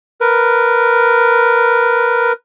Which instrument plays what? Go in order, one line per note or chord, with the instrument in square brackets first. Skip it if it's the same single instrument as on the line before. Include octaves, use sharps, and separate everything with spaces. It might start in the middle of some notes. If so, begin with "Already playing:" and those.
[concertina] A#4 B4